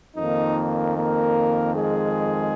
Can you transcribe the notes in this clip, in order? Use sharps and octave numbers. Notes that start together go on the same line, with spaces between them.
F2 D#3 A#3 D#4
A#3 A#4
G#3 G#4